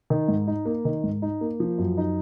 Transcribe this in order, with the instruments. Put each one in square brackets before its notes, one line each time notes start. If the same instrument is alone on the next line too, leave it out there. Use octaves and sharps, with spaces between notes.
[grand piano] D#3
G#2
D#4
A#3
D#3
G#2
D#4
A#3
F3
F#2
D#4